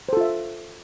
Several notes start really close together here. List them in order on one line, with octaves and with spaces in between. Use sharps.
C5 A4 F4 E5